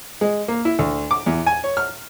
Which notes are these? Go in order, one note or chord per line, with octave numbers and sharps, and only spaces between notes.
G#3
A#3
E4
D2
D6
E2
G#5
C#5
F6